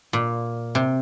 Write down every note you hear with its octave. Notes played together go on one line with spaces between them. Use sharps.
A#2
C3